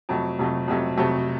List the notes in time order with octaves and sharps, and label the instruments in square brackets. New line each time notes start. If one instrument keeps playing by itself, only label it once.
[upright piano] F2 C3 F#3 A3
F2 C3 F#3 A3
F2 C3 F#3 A3
F2 C3 F#3 A3